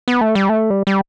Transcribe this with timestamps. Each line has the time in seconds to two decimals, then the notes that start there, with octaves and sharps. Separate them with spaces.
0.08 B3
0.21 A3
0.35 G3
0.49 A3
0.70 G3
0.87 G3